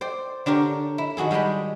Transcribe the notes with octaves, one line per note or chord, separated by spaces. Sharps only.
C5 D5 G5
D3 D4 G4 A#4 C#5
E4
D#3 F#4 G#4 A4
G3 G#3 D#5 G5 B5